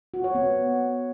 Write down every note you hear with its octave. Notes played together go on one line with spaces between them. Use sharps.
F#4
C#5
B3